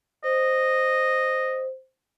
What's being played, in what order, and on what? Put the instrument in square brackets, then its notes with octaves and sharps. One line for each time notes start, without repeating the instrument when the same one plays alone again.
[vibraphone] C5 [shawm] D#5